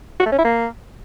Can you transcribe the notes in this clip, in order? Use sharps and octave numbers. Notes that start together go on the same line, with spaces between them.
F#4
A3
C#4
E4
A#3